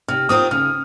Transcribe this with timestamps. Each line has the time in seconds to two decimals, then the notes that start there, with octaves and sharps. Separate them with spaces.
0.08 C3 F6
0.29 F#3 C4 F4 A#4 D#6
0.51 C#3 F6